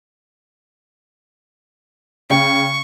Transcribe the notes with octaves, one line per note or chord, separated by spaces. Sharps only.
C#3 G5 C#6